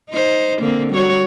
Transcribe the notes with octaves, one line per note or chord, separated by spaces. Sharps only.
D#4 C5
D3 A#3 C4
G3 F#4 C#5